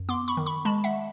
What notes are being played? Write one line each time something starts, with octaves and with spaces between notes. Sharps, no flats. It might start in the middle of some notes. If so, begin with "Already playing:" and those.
Already playing: F#2
B3 C6 D6
B5 C#6
D#3
B5 C#6
G#3 A5 B5
E5 F#5